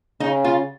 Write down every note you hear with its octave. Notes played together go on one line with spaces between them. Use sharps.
C#3 D#4
F4